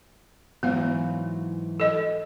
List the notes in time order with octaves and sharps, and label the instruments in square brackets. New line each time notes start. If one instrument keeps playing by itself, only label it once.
[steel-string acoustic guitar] G#2 E3 F#3 [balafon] B3 F5
[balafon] A4 D#5